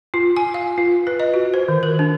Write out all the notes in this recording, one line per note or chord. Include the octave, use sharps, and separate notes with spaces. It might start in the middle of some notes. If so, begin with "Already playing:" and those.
F4
G#5
F5
F4
B4
D#5
F#4
C5
D#3
A#4
D4